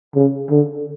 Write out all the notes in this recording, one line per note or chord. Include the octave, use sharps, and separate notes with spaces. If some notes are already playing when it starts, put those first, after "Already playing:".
C#3
D3